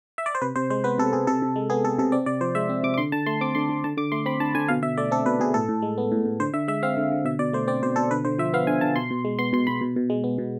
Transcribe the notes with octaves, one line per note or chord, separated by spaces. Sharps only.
E5
D5
C5
C3 B4
C3 C5
G#3 C5
B3 B4
C3 A4
C3 G#4
C3 A4
C3
G#3
B3 G#4
C3 A4
C3 A4
C4 D5
C3 D5
F3 C5
G#3 E5
C4
C3 D6
D6
D3 C6
D3 A5
A3 C6
C4 D6
D3 C6
D3
D3 A5
D3 D6
A3 C6
C4 B5
D3 A5
D3 G#5
B2 F5
B2 E5
A3 D5
C4 A4
B2 B4
B2 G#4
A2 A4
A2
G#3
B3
A2
A2
D3 C5
D3 E5
G#3 E5
C4 F5
D3
D3
B2 E5
B2 D5
A3 C5
C4 D5
B2 C5
B2 A4
D3 B4
D3 C5
F3 E5
B3 F5
D3 G#5
D3 A5
B2 C6
B2
G#3
B3 C6
B2 C6
B2 B5
B2
B2
G#3
B3
B2